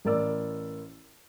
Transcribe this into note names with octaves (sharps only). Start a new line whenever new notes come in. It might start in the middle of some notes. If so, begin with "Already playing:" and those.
A1 A#4 D5 E6